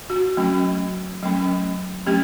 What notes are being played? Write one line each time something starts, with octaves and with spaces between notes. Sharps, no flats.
F#4
F#3 A3 C#4
F#3 A3 C#4
F#3 A3 C#4 G4